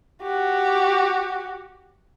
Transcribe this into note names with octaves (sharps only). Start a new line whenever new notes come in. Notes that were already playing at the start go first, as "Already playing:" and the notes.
F#4 G4